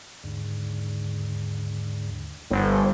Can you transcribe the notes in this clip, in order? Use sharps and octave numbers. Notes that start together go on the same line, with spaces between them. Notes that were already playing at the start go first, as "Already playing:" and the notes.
D#2 G#2 D3
G1 A4 C5 G5